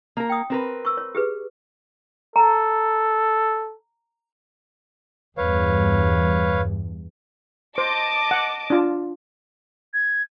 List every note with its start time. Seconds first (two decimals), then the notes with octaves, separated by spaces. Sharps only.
0.17 A#3 A#4
0.30 G5 D#6
0.50 C4 A#4 B4
0.85 C#6 E6
0.97 C#5
1.15 G4 G#4 B4
2.36 A4 A#5
5.38 E2 G2 B4 C#5 F5
7.78 C5 D#5 A5 D6
8.31 F#5
8.70 D4 F4
9.94 G#6